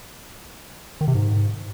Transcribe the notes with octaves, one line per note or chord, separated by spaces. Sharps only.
D#3
C3
G#2